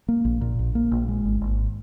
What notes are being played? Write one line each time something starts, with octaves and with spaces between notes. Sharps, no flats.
A#3
A#1
A#2
A#1
A#3
A#1
G#3
G#1
G#1